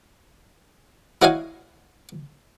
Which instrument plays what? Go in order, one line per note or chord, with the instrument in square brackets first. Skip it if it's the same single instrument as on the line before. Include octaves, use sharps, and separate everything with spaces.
[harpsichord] E4 F#4 C#5 D#5 F5 G#5